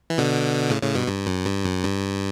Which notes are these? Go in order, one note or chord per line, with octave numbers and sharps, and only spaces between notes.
E3
B2 D3
A2 C#3
A2 C#3
G2 B2
G2
F#2
G2
F#2
G2